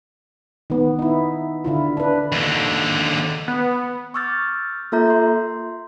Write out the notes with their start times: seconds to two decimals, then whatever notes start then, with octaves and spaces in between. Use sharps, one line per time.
0.70 D#3 B3
0.99 D#4 E4
1.64 D3 E4 F4
1.97 D4 B4
2.32 D#2 D3
3.48 B3
4.14 C#6 D6 E6 F6 G6 A6
4.92 A#3 F4 A4 E5 A#5 G6
5.10 C6